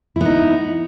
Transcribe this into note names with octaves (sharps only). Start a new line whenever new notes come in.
B3 D#4 E4